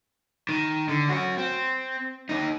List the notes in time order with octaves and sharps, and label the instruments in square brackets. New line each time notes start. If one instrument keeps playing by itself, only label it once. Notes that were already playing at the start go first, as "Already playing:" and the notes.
[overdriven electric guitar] D#3
D3
C#4 F#4
C4
D#2 D#4